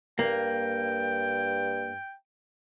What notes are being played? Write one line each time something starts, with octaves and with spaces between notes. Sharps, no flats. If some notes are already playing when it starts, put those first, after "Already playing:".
G2 A#3 G5